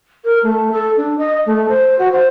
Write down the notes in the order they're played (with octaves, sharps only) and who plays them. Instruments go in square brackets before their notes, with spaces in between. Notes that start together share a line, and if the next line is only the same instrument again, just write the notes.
[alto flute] A#4
A3
A4
D4
D#5
A3
C5
F#4
C5